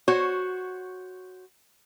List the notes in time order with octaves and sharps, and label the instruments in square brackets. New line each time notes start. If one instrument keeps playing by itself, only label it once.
[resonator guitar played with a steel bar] F#4 C5 C#5